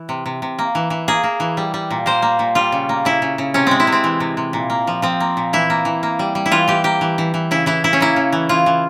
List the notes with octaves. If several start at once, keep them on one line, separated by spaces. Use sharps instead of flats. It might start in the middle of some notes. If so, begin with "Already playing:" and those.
Already playing: E3
C3
C3
C3
A#3
E3
E3
A#3 G#4
A#3
E3
G3
G3
A#2
A#3 C5
A#3
A#2
G3 F4
C#3
A#3
C#3 E4
C#3
C#3
C3 C#4
G#3 C4
E4
C3
C4
E3
C3
C3
A#2
A#3
F3
F3 C4
A#3
A#2
E3 E4
A#3
E3
A#3
G3
G3
E4
E3 F4
E3 G4
A#3 G4
E3
E3
E3
C#3 E4
E3 E4
C#3 E4
C#4
A#3 E4
C#3
E3
E3 F4
E3